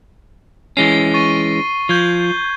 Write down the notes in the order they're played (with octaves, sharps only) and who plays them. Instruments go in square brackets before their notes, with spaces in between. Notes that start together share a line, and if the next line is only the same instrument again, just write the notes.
[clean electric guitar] E3 G#3 C#4 [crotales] C7 G7
[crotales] C#6 A6 D#7
[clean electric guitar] F3 [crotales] G6 G#6 G7